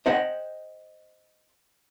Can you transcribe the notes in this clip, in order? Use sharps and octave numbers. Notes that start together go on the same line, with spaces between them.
C5 D#5 F#5 G5